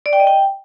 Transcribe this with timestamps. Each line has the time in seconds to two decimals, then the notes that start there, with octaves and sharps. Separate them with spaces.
0.06 D5
0.13 G5
0.20 D#5
0.27 G5